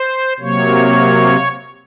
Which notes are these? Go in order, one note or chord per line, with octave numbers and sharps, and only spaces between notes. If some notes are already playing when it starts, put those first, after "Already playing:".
Already playing: C5
C3 F#3 A#3 C#5